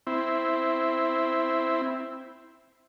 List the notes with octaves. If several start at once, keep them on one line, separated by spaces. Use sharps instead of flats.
C4 E4